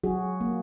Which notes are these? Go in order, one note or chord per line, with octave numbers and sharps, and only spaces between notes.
F#3 F#4 G#4
A#3